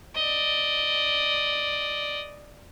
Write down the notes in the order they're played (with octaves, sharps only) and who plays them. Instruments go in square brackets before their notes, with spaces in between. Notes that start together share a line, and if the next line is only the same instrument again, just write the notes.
[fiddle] D5 D#5